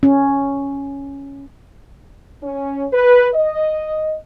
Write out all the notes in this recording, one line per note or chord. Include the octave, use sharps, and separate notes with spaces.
C#4
C#4
B4
D#5